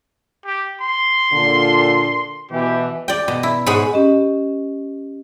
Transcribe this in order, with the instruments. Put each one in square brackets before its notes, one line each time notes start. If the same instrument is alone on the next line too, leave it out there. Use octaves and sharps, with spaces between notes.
[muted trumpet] G4
C6
[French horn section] A#2 D3
[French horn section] B2 E3 [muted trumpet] G4
[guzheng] D5 G5
B2
E4
G#2 G#4 C#5 F#5 B5
[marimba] C#4 G4 D#5